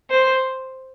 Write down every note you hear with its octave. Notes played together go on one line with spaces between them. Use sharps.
C5